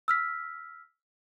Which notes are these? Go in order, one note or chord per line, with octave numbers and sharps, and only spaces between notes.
E6 F6 B6